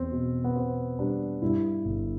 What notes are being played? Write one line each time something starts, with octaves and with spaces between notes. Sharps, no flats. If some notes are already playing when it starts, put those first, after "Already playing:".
Already playing: E2 C4
B2
B3
B2 C4
G3 D4
G2 E4
G1